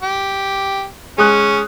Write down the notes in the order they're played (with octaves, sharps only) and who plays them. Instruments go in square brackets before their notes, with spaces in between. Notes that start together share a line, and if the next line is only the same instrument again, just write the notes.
[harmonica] G4
[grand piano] G#3 D#6 F#6 [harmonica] C#4